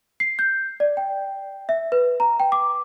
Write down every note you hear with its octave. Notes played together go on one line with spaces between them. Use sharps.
C7
G6
D5
G5
E5
B4
A#5
G5
D6